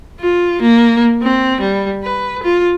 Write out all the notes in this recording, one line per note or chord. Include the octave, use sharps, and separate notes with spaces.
F4
A#3
C4
G3
B4
F4